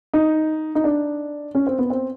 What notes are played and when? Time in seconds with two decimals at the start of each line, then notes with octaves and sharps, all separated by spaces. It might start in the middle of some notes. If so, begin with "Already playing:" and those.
0.14 D#4
0.75 D#4
0.84 D4
1.55 C#4
1.67 C4
1.79 B3
1.90 C4